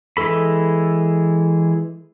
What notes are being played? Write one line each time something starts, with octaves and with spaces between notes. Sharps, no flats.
E3 G#3 A4 B5